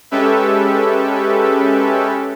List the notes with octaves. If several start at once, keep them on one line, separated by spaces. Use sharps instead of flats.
G#3 C#4 G4 A4 B4 E5